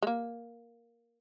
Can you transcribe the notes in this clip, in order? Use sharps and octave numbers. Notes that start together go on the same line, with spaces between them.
G#3
A#3